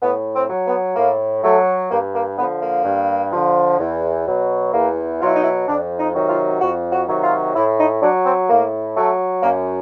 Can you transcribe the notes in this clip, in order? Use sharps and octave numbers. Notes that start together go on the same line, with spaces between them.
A2 B3
C4
F#3
B3
A2 A#3
F#3 A3
G2 A#3
A#3
D3 F3 B3
A#3
G2
D3 F3
E2
B2 F#3
E2 A#3
B2 F#3 F4
E4
D#4
E4
F2 D4
D#4
C3 D#3 F#3
F4
F2 F#4
F#4
C3 D#3 F#3
F4
A2 E4
D#4
F#3 D4
C4
A2 A#3
F#3 A3
F#2 A#3